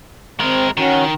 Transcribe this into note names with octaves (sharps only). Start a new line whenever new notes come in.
G#3 C4 A#4
D#3 C#4 F#4